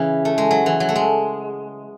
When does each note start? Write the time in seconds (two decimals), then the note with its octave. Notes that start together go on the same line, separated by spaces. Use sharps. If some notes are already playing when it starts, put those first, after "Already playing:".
Already playing: C#3 E3
0.25 A3
0.38 G#3
0.51 F#3
0.66 E3
0.80 F#3
0.89 A3
0.96 G#3